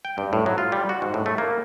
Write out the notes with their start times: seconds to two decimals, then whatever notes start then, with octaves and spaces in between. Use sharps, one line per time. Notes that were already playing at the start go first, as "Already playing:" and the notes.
0.05 G5
0.18 G2
0.33 A2
0.46 F#3
0.58 F4
0.72 G3
0.89 F#4
1.02 G#2
1.14 A2
1.26 A3
1.38 A#3